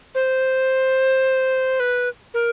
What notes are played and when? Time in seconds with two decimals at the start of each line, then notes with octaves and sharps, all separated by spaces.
0.15 C5
1.80 B4
2.34 A#4